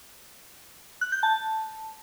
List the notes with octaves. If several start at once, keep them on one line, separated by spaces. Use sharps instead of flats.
F#6
G6
A5